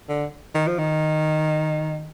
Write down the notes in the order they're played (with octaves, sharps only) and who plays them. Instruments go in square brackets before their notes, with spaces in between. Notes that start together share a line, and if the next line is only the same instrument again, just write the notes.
[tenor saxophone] D3
D#3
F3
D#3